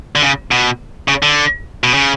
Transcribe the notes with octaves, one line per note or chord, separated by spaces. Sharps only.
D3
C#3
B2
C#3
D3
B2
C#3